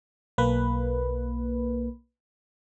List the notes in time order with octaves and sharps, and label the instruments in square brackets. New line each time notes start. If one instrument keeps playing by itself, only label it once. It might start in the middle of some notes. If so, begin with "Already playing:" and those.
[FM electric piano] B1 A#3 B4